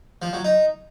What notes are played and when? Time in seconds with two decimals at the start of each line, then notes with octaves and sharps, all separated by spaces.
0.22 F3
0.33 F#3
0.45 D#4